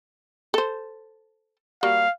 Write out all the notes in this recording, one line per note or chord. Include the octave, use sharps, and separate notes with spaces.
A4 C5
G3 A#3 F#4 F5